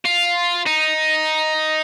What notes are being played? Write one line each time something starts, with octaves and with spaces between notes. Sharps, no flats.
F4
D#4